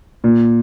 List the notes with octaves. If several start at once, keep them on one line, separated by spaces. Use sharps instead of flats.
A#2